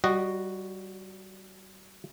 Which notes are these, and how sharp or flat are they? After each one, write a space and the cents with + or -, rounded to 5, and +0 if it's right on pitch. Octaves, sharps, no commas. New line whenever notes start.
G3 -25 F#4 +0 D#5 -10